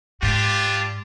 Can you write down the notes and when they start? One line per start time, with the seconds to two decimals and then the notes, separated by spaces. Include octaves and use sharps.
0.23 G#2 D4 F4 G4